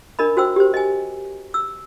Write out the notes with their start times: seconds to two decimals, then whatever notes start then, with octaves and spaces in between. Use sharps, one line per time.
0.19 D4 A#4 D#5 B5
0.37 F#4 C5 G5 E6
0.56 G4 C5
0.74 D#5 G#5
1.54 E6